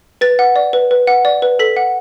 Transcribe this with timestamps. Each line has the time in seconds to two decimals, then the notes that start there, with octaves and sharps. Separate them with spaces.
0.21 B4 A6
0.39 F#5
0.56 D5
0.73 B4
0.91 B4
1.07 F#5
1.25 D5
1.42 B4
1.59 A4 B6
1.76 F#5